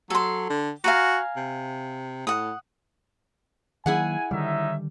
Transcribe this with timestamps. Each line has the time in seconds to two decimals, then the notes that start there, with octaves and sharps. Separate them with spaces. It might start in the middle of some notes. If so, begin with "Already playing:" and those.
0.10 F#3 A4 C6
0.50 D3
0.84 F#4 F5 G#5 A#5
1.37 C3
2.27 A2 F#5 D#6
3.86 D#3 F#3 A#3 E4 G#4 F#5 G#5
4.31 D3 D#3 G3 C#4 D#4 E5